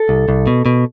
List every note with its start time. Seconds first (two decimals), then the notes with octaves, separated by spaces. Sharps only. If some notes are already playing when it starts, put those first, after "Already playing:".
Already playing: A4
0.09 C2
0.29 C2
0.47 B2
0.66 B2